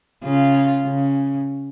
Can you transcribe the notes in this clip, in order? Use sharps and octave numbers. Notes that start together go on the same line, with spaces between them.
C#3 F4
C#3